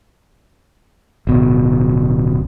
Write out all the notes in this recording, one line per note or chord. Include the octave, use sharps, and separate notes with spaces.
D1 B2